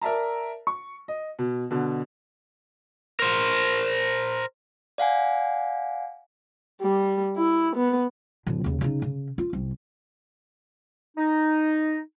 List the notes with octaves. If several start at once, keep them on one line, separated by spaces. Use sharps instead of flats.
A#4 D5 E5 A5 A#5
C#6
D#5
B2
B2 D3
A#4 C5
D5 F5 F#5 G#5
G3
E4
B3
D1 D3
D#2 C#3
C#3 D#4
C#3
F4
C2
D#4